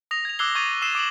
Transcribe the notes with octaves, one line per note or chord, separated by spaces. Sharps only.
D#6 A#6 F7
G#6 F7
D6 E6 F#6 G#6 C7 G7
C#6 G#6 A6 D#7 F7
E6 C7 E7 G7
D6 D7 E7 F#7